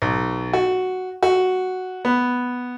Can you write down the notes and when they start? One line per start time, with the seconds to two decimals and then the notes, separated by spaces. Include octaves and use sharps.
0.02 B1
0.53 F#4
1.23 F#4
2.05 B3